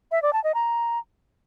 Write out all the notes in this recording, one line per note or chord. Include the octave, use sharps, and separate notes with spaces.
E5
D5
A5
D#5
A#5